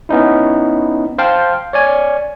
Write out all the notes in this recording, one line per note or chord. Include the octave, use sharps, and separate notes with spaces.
B3 C#4 D#4 E4
C5 F5 G5 A5
C#5 D5 G#5